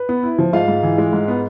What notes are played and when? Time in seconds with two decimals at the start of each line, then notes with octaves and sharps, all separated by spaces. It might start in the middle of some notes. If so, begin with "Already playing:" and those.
Already playing: B4
0.09 B3
0.23 E4
0.38 F3
0.53 G#2 F4 F5
0.68 G#2
0.83 E3
0.98 G#3
1.13 G#2
1.28 B3